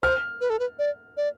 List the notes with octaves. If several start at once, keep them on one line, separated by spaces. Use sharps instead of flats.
C5 F6
B4
A4
B4
D5
D5